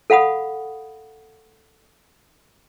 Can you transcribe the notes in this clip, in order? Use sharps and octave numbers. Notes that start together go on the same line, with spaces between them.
A4 F5 F#5 B5 D#6